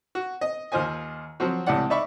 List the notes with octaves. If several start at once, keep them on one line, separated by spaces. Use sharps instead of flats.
F#4
D#5
D#2 F4 C5 D#5 G#5
F3 F#3 C4 F#4
C#2 A2 C3 D5 F#5
D#4 D5 E5 B5 C#6